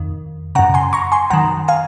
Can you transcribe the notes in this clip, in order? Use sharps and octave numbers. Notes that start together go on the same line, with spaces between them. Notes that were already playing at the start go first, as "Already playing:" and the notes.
Already playing: F2 D#3
F#2 C#3 F#5 A#5
G#5 C6
A#5 C#6
G#5 C6
F#2 D#3 F#5 A#5
F5 G#5